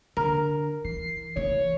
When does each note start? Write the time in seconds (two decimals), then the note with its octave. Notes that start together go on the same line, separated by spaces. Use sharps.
0.17 D3 A#4
0.84 E3 C7
1.36 E3 A3 C#5